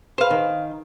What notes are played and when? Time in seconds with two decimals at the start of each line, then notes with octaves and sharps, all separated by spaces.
0.18 G#4 B4 C5 F5
0.30 D#3